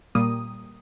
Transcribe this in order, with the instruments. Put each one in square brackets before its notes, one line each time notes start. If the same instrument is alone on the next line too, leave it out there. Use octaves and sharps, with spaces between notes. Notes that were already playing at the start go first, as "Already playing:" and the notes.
[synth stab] A#2 G3 A#3 D#6